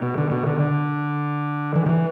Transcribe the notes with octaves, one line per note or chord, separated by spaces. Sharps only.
B2
D3
B2
D3
D3
E3
D3
E3